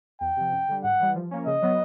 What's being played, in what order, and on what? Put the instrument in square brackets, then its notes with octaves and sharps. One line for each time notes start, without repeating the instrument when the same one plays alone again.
[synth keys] E2 [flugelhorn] G5
[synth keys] C3 F3
F#2
D3 G3
[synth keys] G#2 [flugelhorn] F#5
[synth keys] E3 G3
F3
A#3 C#4
[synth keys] C#3 [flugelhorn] D#5
[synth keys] F#3 B3